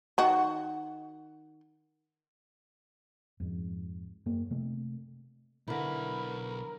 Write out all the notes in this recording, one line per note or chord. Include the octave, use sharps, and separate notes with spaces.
D#3 F#4
F2 G#2
F#2 A#3
C3 A3
B1 D3 E4 A#4 B4 B5